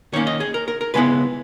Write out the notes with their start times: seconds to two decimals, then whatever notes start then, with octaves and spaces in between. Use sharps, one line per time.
0.13 D#3 A#3 C#4 C#5
0.27 D#5
0.40 G#4
0.54 A#4
0.68 A#4
0.81 A#4
0.94 C#3 G#3 B3 E4 B4